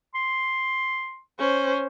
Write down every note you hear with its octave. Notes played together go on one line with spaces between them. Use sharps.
C6
C#4 C5